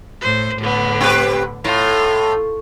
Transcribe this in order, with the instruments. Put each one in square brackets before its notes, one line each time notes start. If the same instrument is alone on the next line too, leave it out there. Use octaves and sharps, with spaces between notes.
[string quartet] A2 C5
A2 D3 B3
[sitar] C4 G4 B4
[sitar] A2 [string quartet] F4